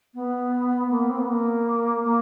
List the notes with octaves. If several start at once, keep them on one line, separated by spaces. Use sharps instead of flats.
B3
A#3
C4
B3
A#3
A#3